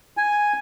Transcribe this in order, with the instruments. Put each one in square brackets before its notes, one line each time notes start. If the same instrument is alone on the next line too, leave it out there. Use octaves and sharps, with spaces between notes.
[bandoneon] G#5